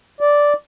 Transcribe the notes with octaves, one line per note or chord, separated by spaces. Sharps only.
D5